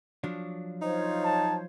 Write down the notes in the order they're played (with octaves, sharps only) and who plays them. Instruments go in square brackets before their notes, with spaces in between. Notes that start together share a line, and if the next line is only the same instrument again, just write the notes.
[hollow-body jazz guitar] F3 F#3 D4
[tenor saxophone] D#4 [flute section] F4 C5 C#5
[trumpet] A5